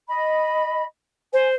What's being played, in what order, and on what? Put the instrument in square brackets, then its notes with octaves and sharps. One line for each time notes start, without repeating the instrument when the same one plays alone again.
[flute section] D#5 B5
[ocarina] C5 [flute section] G#5